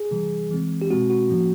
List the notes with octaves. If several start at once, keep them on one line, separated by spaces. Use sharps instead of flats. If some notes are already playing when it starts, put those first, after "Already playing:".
Already playing: G#4
C3 E3 G3
E3 G#3 C4
G4
B2 G#3 C4 F#4
F#4
A2 F3 A#3 C#4